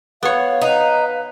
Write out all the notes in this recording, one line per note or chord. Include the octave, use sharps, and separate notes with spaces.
B3 C#5 F5
D#4 B4